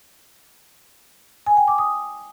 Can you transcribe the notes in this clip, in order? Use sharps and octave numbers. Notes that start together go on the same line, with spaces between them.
G#5
G5
D6
D#6